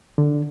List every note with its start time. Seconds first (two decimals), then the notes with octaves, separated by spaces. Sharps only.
0.18 D3